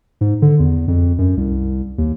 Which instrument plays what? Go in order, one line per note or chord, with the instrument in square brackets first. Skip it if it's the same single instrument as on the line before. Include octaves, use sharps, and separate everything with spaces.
[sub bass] G#2
D3
E2
F2
F#2
C2
D#2